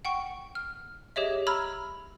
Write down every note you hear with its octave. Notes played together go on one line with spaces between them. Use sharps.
F#5 G5 C#6
F6
G4 G#4 C#5 D#5 E5
A#5 B5 E6 F6 G#6